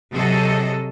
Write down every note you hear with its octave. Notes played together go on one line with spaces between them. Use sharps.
C3 F#3 G#4 A4 D#5